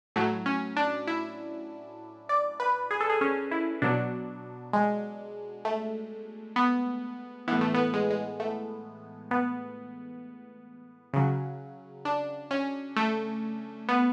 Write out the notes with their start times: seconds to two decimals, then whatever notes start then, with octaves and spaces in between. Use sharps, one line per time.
0.16 A2 F#3 A3
0.46 C#4
0.77 D4
1.07 E4
2.29 D5
2.60 B4
2.91 G#4
3.01 A4
3.10 G#4
3.21 C#4
3.51 E4
3.82 B2 F#3 D4
4.73 G#3
5.65 A3
6.56 B3
7.48 A2 E3 B3
7.61 A3
7.74 B3
7.94 G#3
8.11 G#3
8.40 A3
9.31 B3
11.14 C#3 F#3
12.05 D4
12.51 C#4
12.96 A3
13.89 B3